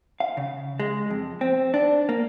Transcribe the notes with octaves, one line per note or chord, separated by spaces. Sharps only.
F5
C#3
G#3
F2
C4
D4
A#3